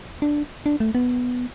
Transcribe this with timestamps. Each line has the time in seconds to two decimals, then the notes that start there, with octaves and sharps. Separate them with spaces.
0.22 D4
0.66 D4
0.80 A3
0.95 B3